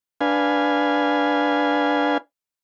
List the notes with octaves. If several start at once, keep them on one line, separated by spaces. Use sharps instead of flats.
D4 B4 F5 G#5